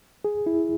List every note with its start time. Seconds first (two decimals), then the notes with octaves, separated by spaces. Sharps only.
0.25 G#4
0.46 E4